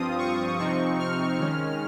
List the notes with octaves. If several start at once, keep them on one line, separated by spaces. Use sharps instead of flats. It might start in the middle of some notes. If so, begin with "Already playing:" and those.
Already playing: G2 F3 C4 F4 D#6
C#6
C3 F3 C4 D#4 C#6
F6
D#3 G#3 C#4